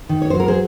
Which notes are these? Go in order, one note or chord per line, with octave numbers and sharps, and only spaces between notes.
D#3
C#5
C5
F#3
A#4
G#4 C5